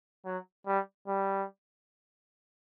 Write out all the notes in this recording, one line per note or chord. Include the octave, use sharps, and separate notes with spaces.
F#3
G3
G3